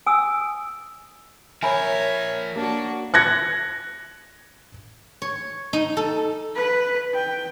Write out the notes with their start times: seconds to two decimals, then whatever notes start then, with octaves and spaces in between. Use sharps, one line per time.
0.07 G#5 D#6 E6
1.63 F3 A#4 C#5 E5 G#5 A#5 B5
2.56 A#3 D4 F#4
3.14 F#6 G#6 A#6 C#7
5.22 C#5
5.73 D#4
5.97 A4
6.56 B4
7.15 G5